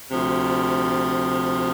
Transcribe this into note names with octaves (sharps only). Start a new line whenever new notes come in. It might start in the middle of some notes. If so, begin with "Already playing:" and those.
D2 C3 F3